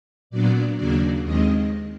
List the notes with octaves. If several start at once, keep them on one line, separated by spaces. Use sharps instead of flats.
A#2 F#3 B3 D4 D5
D#2 C#3 F#3 A#3 D4 D5
D#2 D#3 G#3 C4 D#5